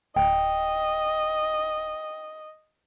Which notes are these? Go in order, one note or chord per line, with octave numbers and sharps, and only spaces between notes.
D1 D#5 G5